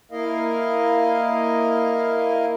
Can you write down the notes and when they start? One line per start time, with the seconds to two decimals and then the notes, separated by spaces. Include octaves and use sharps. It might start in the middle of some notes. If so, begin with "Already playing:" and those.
0.12 A#3 E4 A#4 D#5 F5